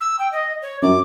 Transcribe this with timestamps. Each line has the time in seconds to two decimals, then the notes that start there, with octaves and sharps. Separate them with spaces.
0.01 E6
0.19 G5
0.32 D#5
0.62 C#5
0.82 F#2 D6